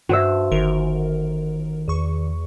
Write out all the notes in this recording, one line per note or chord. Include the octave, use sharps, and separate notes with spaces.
G2 F#4 C5 E5
G1 D#3 A#4
E2 C#6